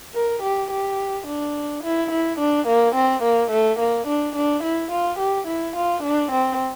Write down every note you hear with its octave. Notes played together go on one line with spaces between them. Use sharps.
A#4
G4
G4
D4
E4
E4
D4
A#3
C4
A#3
A3
A#3
D4
D4
E4
F4
G4
E4
F4
D4
C4